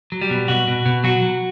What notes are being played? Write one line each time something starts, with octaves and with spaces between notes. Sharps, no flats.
F#3
G3
B2
B2 F#4
B2
B2
F#3 F#4
F#3